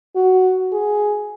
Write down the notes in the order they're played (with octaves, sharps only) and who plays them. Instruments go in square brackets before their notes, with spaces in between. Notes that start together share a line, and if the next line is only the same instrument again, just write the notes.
[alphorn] F#4
G#4